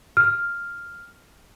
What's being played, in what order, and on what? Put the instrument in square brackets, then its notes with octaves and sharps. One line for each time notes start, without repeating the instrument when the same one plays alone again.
[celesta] F6